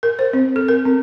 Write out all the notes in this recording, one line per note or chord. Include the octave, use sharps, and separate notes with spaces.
A#4
C5
C4
A4
A#4
C4